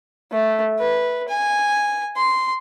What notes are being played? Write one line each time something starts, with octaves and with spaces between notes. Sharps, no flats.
A3
B4
G#5
C6